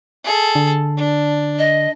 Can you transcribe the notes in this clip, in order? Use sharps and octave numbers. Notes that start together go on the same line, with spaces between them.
G#4 A4
D3
D4
D#5